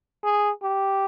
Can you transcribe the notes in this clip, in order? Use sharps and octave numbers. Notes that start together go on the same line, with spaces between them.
G#4
G4